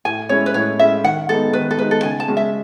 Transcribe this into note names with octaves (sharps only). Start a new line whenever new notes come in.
A2 G#5
G#3 C#4 E4 C#5
B4
A2 C#5
G#3 C#4 E4 E5
D#3 F#5
G#3 B3 D#4 A4
D#3 B4
A4
G#3 B3 D#4 B4
A4
C#3 G#5
A5
G#3 C#4 F#4
E5